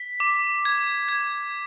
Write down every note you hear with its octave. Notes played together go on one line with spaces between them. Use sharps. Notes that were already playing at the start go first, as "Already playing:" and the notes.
Already playing: B6
D6
G#6
G#6